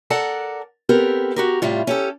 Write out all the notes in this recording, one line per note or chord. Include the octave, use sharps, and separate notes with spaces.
A4 A#4 D5 F#5 A5
B3 C4 G4 A4 A#4
F#4 G4 A#4
A2 C3 G3 F4
C#4 G4 A4